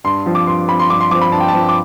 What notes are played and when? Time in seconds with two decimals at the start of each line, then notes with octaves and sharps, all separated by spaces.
0.04 G2 C6
0.26 F3 C4
0.35 D6
0.47 G2 C6
0.68 F3 C4 B5
0.79 C6
0.90 G2 D6
1.00 C6
1.11 F3 D6
1.15 C4
1.22 B5
1.32 G2 A5
1.40 G5
1.48 A5
1.54 F3 C4
1.69 D6